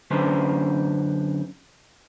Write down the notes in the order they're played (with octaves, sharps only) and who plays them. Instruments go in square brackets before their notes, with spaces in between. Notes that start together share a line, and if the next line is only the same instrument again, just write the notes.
[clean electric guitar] F#2 D3 C#4 D4 B4 C5